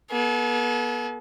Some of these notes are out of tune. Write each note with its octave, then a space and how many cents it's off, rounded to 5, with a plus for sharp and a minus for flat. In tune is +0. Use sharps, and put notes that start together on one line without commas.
B3 -40 A4 -40